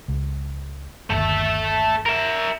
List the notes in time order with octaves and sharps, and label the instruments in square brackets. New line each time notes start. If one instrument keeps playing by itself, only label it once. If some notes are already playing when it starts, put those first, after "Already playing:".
[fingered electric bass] C#2
[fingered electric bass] G1 D#2 [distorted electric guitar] A3 E5
[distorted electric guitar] A#4 E5